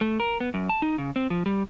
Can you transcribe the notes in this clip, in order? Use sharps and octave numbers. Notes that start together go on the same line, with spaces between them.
A3
A#4
B3
F#2
A5
D#4
C#3
C4
F3
G3